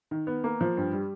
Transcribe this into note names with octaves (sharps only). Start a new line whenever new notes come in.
D#3
B3
A#3
F3
G2
G3